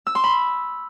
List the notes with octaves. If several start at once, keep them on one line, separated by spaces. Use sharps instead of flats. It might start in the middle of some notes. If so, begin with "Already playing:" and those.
E6
C6
B5